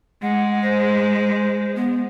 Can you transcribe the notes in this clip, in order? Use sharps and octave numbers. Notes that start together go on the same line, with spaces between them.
G#3 F#5
C5
B3